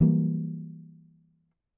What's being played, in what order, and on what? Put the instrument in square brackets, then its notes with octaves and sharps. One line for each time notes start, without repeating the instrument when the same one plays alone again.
[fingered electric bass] E3 F#3 G3 A#3